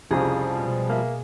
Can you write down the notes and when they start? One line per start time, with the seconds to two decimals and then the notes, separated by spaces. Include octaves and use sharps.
0.11 C2 F2 C#3 F3 G3 G#4
0.55 B2 G#3
0.90 A#3 E5